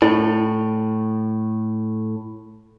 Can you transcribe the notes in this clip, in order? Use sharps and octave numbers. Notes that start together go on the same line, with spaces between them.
A2 E4